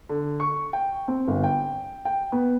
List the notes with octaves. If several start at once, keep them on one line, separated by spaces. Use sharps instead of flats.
D3
C#6
G5
C4
G1
G5
G5
B3